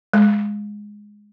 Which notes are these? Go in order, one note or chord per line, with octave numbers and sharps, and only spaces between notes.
G#3